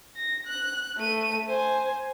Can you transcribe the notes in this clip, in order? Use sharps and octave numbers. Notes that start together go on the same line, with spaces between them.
A#6
F#6
A3 D#7
C5 G#5